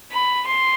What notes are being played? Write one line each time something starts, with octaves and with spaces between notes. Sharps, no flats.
B5
C6